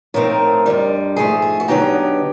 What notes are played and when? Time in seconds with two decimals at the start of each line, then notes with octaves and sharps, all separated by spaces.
0.14 A2 F3 A3 C4 D#4 A#4
0.66 F2 D3 G3
1.16 G#2 F3 A3 G#4
1.42 G#4
1.60 F#4
1.68 D3 F#3 B3 D#4 G4